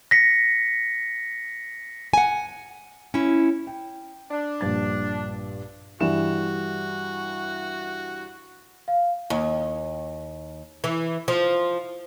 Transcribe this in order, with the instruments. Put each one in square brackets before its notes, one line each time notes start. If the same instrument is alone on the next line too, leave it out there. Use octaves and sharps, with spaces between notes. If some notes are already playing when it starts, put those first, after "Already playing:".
[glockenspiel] A#6 B6 C#7
[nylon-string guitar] F#5 G#5
C#4 E4
[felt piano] G5
[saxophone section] D4
[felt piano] A#1 G2 A6
[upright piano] G2 E3 E7 [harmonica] F#4
[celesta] F5
[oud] D#2
E3
F3